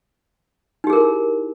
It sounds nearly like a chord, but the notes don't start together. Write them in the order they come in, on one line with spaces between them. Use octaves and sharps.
D#4 G4 G#4 A#4 E4